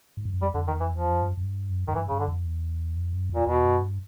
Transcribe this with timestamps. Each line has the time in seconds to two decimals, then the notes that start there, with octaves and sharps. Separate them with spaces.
0.17 G#2
0.25 G2
0.34 F#2
0.42 F2 G3
0.54 F2 D3
0.68 E2 D#3
0.80 F2 E3
0.93 E2 F3
1.10 F2
1.22 G2
1.26 F#2
1.37 F#2
1.44 G2
1.70 F#2
1.88 F#2 D#3
1.94 G2 E3
2.09 G2 C#3
2.20 D3
2.28 F2
2.45 E2
2.96 F2
3.13 F#2
3.30 E2
3.35 A#2
3.47 E2 B2
3.64 F#2
3.81 G2